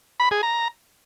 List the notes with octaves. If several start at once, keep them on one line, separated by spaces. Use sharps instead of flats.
B5
G#4
A#5